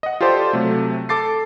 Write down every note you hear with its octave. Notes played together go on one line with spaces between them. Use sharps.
D#5 F#5
F4 G4 A4 C5 D5
C3 F#3 A3
A4 D6 A6 C7